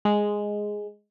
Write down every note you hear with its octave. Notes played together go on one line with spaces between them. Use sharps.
G#3